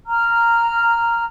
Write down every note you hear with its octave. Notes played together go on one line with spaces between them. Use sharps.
A#5 F6